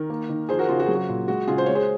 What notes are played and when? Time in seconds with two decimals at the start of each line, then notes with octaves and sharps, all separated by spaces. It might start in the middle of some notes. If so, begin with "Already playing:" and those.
Already playing: D#3 A#4
0.10 A#3
0.29 D#3
0.49 F3 G#4 C5
0.59 F#4 A#4
0.68 C#3 F4 G#4
0.79 F#4
0.86 F#3 G#4
0.95 F#4
1.09 A#2
1.28 G#3 F#4
1.47 C#3 F4 G#4
1.58 C5
1.66 G#3 C#5
1.75 G#4 C5